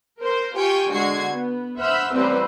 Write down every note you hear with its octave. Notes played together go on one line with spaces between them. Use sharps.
A#4 C5
F4 G4 G5 G#5 C#6
D3 G#3 F#4 G#6 C7
B3
C5 E5 F#5 B5 E6 F6
A1 G3 C4 B4 C5 E6